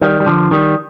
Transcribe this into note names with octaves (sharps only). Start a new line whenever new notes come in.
D#3 G3
G3
D3 F3
D#3 G3